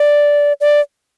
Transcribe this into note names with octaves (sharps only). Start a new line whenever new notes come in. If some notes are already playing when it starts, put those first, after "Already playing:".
Already playing: D5
D5